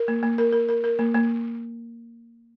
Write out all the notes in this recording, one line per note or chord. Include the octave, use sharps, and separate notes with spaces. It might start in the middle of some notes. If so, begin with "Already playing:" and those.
Already playing: A#4
A#3
A#3
A#4
A#4
A#4
A#4
A#3
A#3